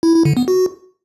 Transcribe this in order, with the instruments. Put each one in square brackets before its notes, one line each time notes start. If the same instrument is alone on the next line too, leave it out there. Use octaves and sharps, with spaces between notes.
[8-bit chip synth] E4
E4
D3
B3
F#4